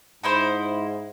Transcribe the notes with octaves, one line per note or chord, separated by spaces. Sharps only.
G#2 D#4 E4 C5